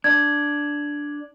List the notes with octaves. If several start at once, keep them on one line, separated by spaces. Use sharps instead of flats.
D4 G#6